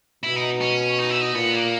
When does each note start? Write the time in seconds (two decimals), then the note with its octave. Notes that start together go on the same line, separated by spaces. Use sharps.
0.23 B2 E4
0.36 D#4
0.61 C#4
0.99 D#4
1.10 E4
1.21 D#4
1.35 A#2 B3
1.54 A#3